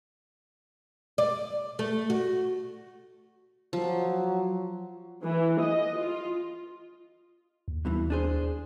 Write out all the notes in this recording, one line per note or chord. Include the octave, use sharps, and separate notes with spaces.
D5
A3
F#4
F3 F#3
E3
D#5
F4
D#2
G2 B2 E3
D4 G#4 C5